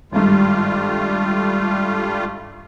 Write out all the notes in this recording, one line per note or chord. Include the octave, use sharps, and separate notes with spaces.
G#1 G2 G3 A3 F4